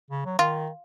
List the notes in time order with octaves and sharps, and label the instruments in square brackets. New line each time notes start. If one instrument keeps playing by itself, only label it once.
[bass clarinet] C#3
F#3
[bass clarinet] D#3 [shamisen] F4